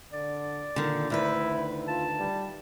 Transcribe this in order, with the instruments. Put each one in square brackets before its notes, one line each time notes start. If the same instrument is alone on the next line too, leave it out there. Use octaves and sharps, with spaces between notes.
[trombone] D3 [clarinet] D5
[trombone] A#2 [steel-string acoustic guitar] D3 D#3
[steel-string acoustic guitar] D2 D#3 B4 [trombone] E4
[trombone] F4 [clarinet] A5
[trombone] G3